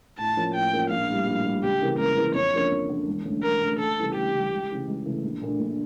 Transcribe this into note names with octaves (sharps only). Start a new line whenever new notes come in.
A2 A5
F3 A#3 C#4
A2 G5
F3 A#3 C#4
A#1 F5
A2 G3
A#1
A2 G3
C#2 G4
C#3 E3 A#3
C#2 A#4
C#3 E3 A#3
F2 C#5
D3 F3 A#3 C#4
F2
D3 F3 A#3 C#4
E1
D2 D3 A3 C#4
E1 A#4
D2 D3 A3 C#4
D2 A4
C#3 E3 G3
D2 G4
C#3 E3 G3
C#2
C#3 E3 A3
C#2
C#3 E3 A3
A#1
A#2 A3 D4
A#1